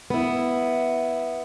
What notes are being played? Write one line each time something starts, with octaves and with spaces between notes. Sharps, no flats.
B3 E4